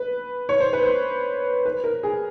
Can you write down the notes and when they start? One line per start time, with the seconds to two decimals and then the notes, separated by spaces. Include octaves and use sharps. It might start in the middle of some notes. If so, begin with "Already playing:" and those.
Already playing: B4
0.49 C#5
0.60 C5
0.73 B4
0.84 C5
1.65 B4
1.84 A#4
2.03 G#4